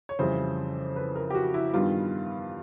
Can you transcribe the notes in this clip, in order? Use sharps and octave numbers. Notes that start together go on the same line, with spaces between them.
C#5
F2 C#3 E3 G3 C5
B4
A#4
G4
F#4
E4
G2 D#3 G3 B3 F4